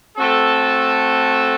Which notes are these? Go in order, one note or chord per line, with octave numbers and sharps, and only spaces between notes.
A3 C4 F#4 A4